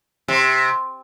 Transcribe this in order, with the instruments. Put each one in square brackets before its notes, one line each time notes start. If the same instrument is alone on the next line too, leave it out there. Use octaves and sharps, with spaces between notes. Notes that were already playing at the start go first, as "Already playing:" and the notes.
[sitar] C3